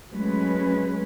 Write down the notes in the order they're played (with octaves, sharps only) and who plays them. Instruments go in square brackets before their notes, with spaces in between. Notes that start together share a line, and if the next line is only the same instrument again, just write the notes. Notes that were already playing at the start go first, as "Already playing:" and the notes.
[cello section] F#3 G#3 A3 C#4 B4